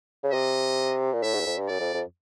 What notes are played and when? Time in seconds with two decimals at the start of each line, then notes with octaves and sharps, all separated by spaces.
0.23 C#3
0.32 C3 D#5
1.13 A#2
1.23 A2 E5
1.34 G#2
1.40 E2
1.46 F2
1.57 G2
1.68 F#2 D5
1.80 F2
1.94 F2